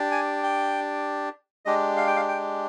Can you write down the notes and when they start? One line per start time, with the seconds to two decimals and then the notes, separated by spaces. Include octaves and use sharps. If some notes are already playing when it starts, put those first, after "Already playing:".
Already playing: D4 G4
0.11 G#5
0.43 G5
1.65 G#3 D4 G4 D#5
1.97 F5
2.07 G5
2.16 F5
2.28 G5